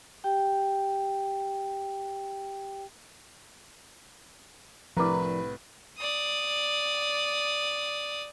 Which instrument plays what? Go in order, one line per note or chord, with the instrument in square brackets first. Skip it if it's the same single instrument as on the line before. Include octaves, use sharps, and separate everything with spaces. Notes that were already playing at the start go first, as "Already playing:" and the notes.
[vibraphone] G4 G5
[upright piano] C2 A2 [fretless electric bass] F3 D4 [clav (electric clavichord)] A#4 D5 [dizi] B4
[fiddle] D5 D#6